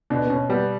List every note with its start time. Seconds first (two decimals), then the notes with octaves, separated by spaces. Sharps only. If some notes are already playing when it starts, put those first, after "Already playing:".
0.10 B2 D4
0.22 B3
0.30 B2 C#4
0.49 G3 B3